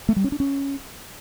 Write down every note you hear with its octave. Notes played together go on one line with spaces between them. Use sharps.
A3
G3
C#4
D4
C#4